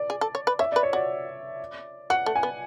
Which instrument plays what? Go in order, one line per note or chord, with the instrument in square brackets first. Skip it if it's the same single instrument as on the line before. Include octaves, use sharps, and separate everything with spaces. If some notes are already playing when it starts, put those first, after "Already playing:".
Already playing: [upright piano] D5
[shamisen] G#4
A4
C#5
B4
[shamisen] C#5 [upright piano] E5
[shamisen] B4 [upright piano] D5
[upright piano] C#5
[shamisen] F#4 [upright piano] D5
[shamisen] F#4 [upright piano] F#5
[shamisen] A3
[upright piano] G#5
[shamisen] B3